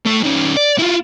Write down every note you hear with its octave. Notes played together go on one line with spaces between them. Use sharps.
A3 C#5
D#3 C#4
D5
E4 F4